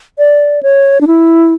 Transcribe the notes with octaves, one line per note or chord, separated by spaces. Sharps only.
D5
C#5
D4
E4